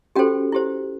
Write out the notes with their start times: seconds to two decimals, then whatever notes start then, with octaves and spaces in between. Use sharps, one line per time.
0.16 C#4 F#4 G4 A4 C5 G5
0.52 E4 G4 C5